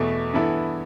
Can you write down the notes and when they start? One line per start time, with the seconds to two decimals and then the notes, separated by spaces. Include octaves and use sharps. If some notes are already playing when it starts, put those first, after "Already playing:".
Already playing: E2 B2 A3
0.33 G2 E3 B3 E4 A4